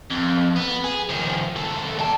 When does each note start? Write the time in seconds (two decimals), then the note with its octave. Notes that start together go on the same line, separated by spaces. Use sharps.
0.11 F2
0.56 B3
0.84 G#4
1.09 D#3 F3
1.56 D#2 A4
1.99 G3 A5